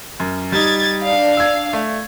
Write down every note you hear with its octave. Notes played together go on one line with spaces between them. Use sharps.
F#2
G3 D#4 G#6 A6
D4 F5
E6 G#6
A3